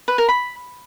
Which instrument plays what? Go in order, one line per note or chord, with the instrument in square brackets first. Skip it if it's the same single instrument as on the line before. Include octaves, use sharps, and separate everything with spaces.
[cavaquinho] B4
A#4
B5